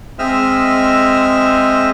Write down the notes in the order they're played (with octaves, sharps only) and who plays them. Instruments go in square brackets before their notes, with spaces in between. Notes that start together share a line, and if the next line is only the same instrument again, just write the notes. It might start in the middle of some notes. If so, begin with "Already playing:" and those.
[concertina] G#3 C4 D#5 E5 E6 F6